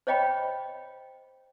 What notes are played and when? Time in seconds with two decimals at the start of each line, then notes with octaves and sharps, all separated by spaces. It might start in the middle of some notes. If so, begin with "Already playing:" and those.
0.07 C5 C#5 D#5 G5 B5